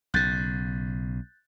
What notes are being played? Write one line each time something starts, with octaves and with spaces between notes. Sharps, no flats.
B1 C#3 F#6 G6 A6